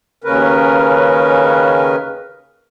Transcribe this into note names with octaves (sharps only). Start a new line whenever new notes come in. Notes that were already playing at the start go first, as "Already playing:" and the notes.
D#2 C#3 C#4 A#4 B4